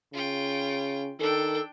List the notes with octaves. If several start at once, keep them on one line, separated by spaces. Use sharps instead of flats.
C#3 F4 G5
D#3 D4 A4 G5